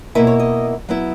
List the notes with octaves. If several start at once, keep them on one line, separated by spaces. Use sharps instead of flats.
B2 A#3 E4 B4
C#5
D#5
F#3 B3 E4